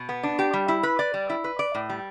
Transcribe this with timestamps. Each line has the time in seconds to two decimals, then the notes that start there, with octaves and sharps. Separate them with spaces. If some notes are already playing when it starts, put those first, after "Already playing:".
Already playing: B2
0.09 B3
0.23 D4
0.39 G4
0.53 G3
0.68 E4
0.83 B4
0.99 D5
1.14 G3
1.30 E4
1.44 B4
1.59 D5
1.75 A2
1.89 G3